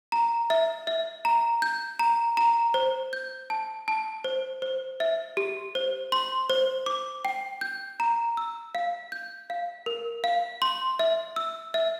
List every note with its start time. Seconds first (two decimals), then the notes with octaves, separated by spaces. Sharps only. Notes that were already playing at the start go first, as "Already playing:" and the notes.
0.12 A#5
0.50 E5
0.87 E5
1.25 A#5
1.62 G6
1.99 A#5
2.37 A#5
2.74 C5
3.13 G6
3.50 A5
3.88 A5
4.24 C5
4.62 C5
5.00 E5
5.37 G4
5.75 C5
6.12 C6
6.50 C5
6.86 D6
7.25 G5
7.61 G6
8.00 A#5
8.37 E6
8.75 F5
9.12 G6
9.50 F5
9.86 A#4
10.24 F5
10.62 C6
10.99 E5
11.36 E6
11.74 E5